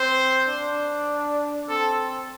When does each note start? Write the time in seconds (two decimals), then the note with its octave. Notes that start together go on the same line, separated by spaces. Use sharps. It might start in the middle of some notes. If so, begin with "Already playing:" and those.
Already playing: C4 C5
0.48 D4
1.68 C4 A4